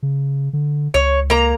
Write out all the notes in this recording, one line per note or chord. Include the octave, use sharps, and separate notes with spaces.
C#3
D3
C#2 C#5
A#3 A#5